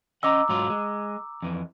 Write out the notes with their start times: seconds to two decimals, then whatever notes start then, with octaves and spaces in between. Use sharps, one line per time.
0.23 C#4 D#5 F#5 A#5 D6 E6
0.49 G#2 F#3 F4
0.70 G#3
1.42 F2 E3